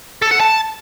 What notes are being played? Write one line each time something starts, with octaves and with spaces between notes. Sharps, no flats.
A4
F#5
A5